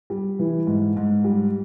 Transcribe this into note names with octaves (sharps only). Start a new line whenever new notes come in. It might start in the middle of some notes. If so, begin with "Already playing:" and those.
G3
E3
G#2
G#2
G3